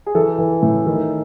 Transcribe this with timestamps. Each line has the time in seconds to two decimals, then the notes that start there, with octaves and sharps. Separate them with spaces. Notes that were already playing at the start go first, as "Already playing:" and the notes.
0.06 G#4
0.15 E3 A4
0.38 E3
0.63 A2
0.86 D#3